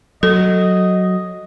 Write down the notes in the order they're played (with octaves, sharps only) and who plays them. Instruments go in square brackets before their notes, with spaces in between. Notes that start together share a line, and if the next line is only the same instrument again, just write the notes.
[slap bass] F#3 [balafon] A4 [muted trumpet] D#5